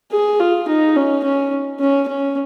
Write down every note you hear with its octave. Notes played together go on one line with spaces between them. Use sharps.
G#4
F4
D#4
C#4
C#4
C#4
C#4